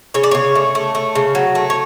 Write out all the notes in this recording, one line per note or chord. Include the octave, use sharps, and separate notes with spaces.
C#3 C#5
D5
C#3 C#5
A3
A3
A3
C#3
F#3
A3
C#5